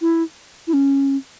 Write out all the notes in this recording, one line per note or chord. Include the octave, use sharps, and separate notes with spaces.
E4
E4
C#4